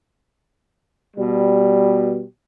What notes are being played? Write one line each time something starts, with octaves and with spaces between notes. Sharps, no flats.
B2 G3